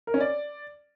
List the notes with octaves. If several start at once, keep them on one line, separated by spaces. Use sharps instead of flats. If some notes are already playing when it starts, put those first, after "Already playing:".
A#4
C#4
D5